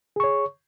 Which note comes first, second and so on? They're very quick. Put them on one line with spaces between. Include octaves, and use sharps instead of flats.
G#4 C#6 C#5